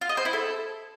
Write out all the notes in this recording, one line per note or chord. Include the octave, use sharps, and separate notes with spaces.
F4
D#5
C5
E4
A4